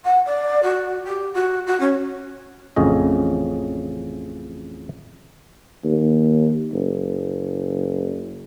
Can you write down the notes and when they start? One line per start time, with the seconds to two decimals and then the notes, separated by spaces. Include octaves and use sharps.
0.04 F#5
0.25 D5
0.62 F#4
1.04 G4
1.33 F#4
1.66 F#4
1.80 C#4
2.76 A1 F2 C#3 C#4 D#5
5.84 D#2
6.73 F#1